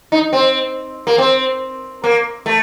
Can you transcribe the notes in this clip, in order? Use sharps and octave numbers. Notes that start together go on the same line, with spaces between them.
D#4
C4
A#3
C4
A#3
A3